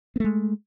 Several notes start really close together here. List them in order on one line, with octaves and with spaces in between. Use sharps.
B3 A3 G#3